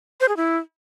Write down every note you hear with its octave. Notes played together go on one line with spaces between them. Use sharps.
C5
G#4
E4